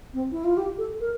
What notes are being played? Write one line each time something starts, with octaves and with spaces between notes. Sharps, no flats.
C4
E4
F4
G4
A4
A#4